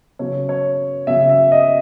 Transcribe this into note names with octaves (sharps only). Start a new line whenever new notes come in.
C#3 F#3 C#5
C#5
C#3 F#3 E5
E5
D#5